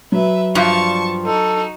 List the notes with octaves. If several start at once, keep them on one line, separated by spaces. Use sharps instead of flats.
F#3 B4 E5
G2 F3 A5 C#6
D#4 F#4 A4